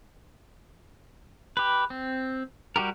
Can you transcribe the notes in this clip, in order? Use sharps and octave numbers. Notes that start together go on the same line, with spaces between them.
G4 B4
C4
G3 F#4 G4 A#4